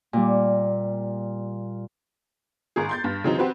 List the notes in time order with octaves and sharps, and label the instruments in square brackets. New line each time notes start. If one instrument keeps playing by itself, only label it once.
[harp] A#2 G3
[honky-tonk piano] G#1 G#4
C6 G6 A6
G2
C#3 E3 F#3 C4 D#4
C4 F#4 G4 B4 C5